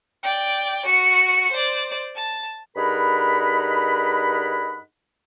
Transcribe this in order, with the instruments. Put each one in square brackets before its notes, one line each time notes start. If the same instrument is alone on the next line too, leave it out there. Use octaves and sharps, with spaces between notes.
[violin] D5 G5
F#4 C#7
C5 D5
A5
[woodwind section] G2 D#4 G#4 A#4 F#5 B5